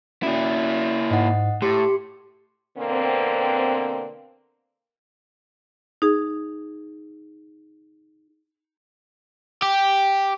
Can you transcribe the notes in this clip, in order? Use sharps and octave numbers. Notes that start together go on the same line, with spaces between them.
A#3 C#4 E4 F#4 D5
G#2 D#5 F#5
A2 G4 C6 C#7
B2 D3 A#3 C4
D#4 G#4
G4